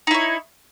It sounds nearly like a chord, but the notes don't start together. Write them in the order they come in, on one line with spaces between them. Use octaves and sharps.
D#4 E4 C#5